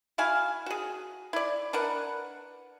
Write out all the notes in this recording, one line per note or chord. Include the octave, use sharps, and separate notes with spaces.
E4 F#4 F5 G#5
F#4 G#4
E4 D5
D4 A#4 B4 F#5